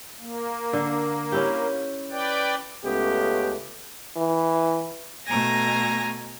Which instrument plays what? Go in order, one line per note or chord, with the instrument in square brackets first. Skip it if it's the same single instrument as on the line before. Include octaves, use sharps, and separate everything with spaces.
[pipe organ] A#3
[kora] D3
C#4 E4 G4
[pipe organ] B4 D5 G5
[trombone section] C#2 A3 B3 C#4 G4
[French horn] E3
[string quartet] B2 A3 G#5 A#5 A#6